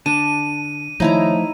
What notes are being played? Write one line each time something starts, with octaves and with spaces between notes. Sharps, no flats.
D3 D4 A5 D#7
D#3 F3 A3 D#4 E4 C#5 A#5